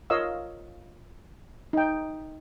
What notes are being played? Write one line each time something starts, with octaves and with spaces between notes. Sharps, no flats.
F4 A#4 C#5 D#5 F5 E6
D#4 G5